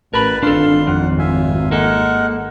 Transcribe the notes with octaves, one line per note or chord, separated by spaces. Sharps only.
A1 A#4 B4 A5 B5
G#1 G2 D4 F4 A4 C6
F2 F#5
F4 E5 G#5
G#3 A#3 A4 A#4 F#5